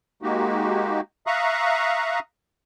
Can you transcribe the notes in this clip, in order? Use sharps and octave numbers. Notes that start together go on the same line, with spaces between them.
G#3 A#3 D#4 F#4 G4
E5 F5 A#5 C#6 D#6 F#6